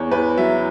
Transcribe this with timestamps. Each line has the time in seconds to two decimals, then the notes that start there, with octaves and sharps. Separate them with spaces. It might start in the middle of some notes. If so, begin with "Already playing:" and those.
Already playing: E2 C#5
0.11 E2 B4
0.37 F#3 E5